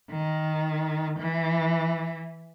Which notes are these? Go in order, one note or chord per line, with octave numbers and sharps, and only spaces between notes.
D#3
E3